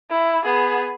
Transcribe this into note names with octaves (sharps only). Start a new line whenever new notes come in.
E4
B3 G#4